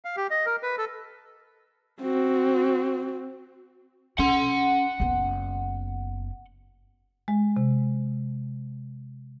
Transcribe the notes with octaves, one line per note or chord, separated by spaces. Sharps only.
F5
G4
D#5
A#4
B4
A4
C4 F#4
C#4 F#5 C6
F#1 B3
G#3
C3